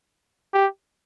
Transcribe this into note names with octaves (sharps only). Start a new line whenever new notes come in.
G4